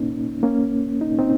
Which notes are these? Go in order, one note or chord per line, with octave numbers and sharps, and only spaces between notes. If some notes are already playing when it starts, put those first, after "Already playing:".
Already playing: A#3 C#4 D#4
A#3 C#4
D#4
C4 D#4